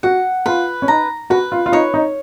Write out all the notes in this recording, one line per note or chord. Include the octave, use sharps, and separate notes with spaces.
F#4 F#5
F4 B4
C#4
D#4 A#5
F#4 B4
F4
F4
D#4 C#5
D#4